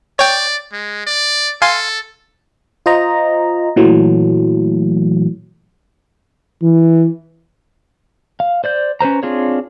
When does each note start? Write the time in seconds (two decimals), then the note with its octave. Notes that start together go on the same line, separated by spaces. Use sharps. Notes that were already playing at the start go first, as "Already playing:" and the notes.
0.19 C#5 D5 G5
0.73 G#3
1.06 D5
1.62 A4 F5 G#5 C6
2.86 F4 C5 D#5 A#5
3.76 A#2 E3 F#3 A3
6.62 E3
8.40 F5
8.64 C5 D5 G6
9.01 C#4 B4 C5 A#5
9.23 C4 D4 F4 G#4 C#5